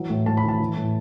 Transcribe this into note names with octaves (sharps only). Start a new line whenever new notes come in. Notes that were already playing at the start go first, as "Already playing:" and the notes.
Already playing: E3 F#3
A2
A2 A5
B5
E3 A5
E3
A2